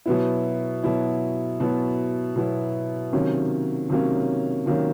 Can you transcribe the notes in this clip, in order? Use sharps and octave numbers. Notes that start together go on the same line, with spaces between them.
B2 F#3 B3 E4
B2 F#3 B3 E4
B2 F#3 B3 E4
B2 F#3 B3 E4
C3 D#3 F#3 A#3 C#4
C3 D#3 F#3 A#3 C#4
C3 D#3 F#3 A#3 C#4